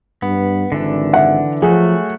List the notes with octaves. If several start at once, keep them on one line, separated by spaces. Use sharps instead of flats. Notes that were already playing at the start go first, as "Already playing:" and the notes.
G2 B3
G#1 D3 E3 D4
E5 F#5
F3 F#3 A3 F#4 G#4